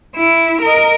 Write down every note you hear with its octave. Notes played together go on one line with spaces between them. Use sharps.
E4
A#4 D#5